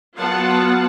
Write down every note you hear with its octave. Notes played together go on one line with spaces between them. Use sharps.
F#3 B3 F4 F#5 A5